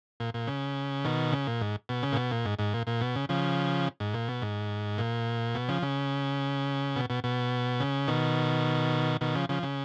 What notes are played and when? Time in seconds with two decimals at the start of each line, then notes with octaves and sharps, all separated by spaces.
0.20 A#2
0.34 A#2
0.47 C#3
1.04 B2 D#3
1.32 C#3
1.47 A#2
1.61 G#2
1.89 B2
2.03 C#3
2.12 A#2
2.16 B2
2.31 A#2
2.45 G#2
2.59 G#2
2.74 A#2
2.87 A#2
3.01 B2
3.16 C#3
3.29 C#3 F3
4.00 G#2
4.14 A#2
4.28 B2
4.42 G#2
4.98 A#2
5.55 B2
5.68 C#3 F3
5.82 C#3
6.96 B2
7.10 B2
7.24 B2
7.80 C#3
8.08 B2 D#3
9.21 B2 D#3
9.35 C#3 F3
9.49 C#3 F3
9.63 C#3